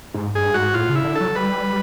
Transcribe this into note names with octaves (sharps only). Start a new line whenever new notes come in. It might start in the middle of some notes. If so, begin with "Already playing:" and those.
G#2
G2 G#4
G#2 F#4
A2 F4
C#3
E4
D3
A4
F#3
G3 B4